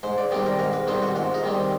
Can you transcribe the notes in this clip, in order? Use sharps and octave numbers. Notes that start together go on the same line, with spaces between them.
G#2 C5
D5
D#3 G3 C4 D5
A#4
G#2 A#4
B4
D#3 G3 C4 C5
F#4
G#2 F4
D#4
D#3 G3 C4